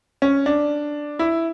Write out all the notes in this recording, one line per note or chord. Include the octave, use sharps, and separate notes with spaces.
C#4
D4
E4